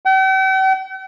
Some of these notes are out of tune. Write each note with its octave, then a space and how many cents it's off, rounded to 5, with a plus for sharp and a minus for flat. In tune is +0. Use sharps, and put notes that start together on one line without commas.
G5 -45